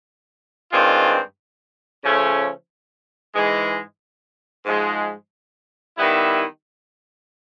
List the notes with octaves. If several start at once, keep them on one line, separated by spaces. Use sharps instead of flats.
G2 D#3 G#3 C4 F4
C#3 F3 A3 C#4
G#2 E3 G#3
G#2 F3 G#3
D#3 G3 B3 E4